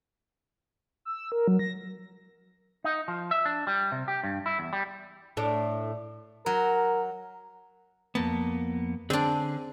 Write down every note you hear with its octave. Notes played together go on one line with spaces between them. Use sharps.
E6
A#4
F#3
A#6
D#4
F3
E5
D4
G3
C3
G4
G2
E4
E2
G3
A2 D4
F#3 A#4
F2 A#3 B3 A5
D3 C4 D4 G#4 D5